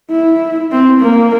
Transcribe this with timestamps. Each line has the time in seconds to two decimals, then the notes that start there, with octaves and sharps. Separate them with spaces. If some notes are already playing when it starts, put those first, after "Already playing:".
0.10 E4
0.72 C4
1.01 A#3